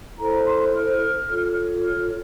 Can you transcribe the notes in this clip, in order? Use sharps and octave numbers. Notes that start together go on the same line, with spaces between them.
E4 A4 C5 A#5
C6
F6
F4 A4 C#5
F6